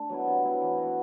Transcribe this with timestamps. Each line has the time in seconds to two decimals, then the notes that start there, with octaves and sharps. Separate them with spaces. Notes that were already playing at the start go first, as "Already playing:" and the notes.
Already playing: A3 D4
0.09 F#3 B3 E4
0.27 C3
0.44 F#3 B3 E4
0.61 E3
0.78 F#4
0.83 B3